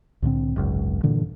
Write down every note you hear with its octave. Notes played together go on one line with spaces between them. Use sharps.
C2 A2 D3 C4
G#1 C#2 F#2
G2 A#2 D3 E3